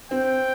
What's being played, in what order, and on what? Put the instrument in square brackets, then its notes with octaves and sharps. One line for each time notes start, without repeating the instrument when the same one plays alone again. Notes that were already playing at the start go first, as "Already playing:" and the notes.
[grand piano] C4 [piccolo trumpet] G5